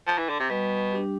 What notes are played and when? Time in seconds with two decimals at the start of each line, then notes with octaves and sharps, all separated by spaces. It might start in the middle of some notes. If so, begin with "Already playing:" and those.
0.07 F3
0.18 E3
0.29 D3
0.40 C3
0.50 B2 G3
0.91 D4 G4